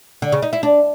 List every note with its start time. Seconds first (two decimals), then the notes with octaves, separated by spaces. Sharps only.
0.22 D3
0.32 C#3
0.43 D#4
0.53 E4
0.63 D4